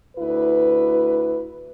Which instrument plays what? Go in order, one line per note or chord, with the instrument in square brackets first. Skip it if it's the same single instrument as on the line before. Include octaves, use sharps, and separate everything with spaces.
[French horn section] D2 E4 B4